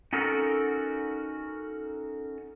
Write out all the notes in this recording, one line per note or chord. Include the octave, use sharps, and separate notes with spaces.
C#4 D#4 F#4 A4 A#4